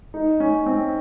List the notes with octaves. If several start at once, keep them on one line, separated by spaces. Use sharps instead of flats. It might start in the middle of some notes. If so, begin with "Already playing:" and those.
D#4
C#4
C4